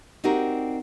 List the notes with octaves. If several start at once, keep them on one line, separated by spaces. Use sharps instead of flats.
C4 D4 D#4 F#4 G4 A#4